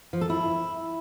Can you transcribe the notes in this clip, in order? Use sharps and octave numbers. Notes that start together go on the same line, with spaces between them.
F3
A4
E4